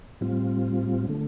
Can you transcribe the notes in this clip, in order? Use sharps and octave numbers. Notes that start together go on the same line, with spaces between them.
A2 G3 C4 F4
D3 A3